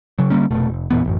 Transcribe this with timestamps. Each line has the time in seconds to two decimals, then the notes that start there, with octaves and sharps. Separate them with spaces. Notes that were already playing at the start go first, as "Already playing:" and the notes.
0.19 C#3 F#3
0.30 D3 G3 A#3 C#4
0.51 F1 B2 A3
0.68 F1
0.90 E2 A#2 E3 B3
1.05 A1 F#2